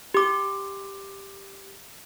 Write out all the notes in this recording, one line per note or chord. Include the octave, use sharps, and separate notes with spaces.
G4 D6